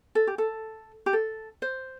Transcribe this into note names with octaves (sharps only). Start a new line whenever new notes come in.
A4
G4
A4
G4
A4
C5